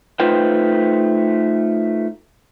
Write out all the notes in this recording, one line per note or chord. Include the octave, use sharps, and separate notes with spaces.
A3 D#4 F4 B4 C5 G5